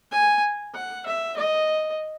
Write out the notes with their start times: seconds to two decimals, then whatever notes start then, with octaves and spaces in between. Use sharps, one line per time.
0.12 G#5
0.74 F#5
1.06 E5
1.36 D#5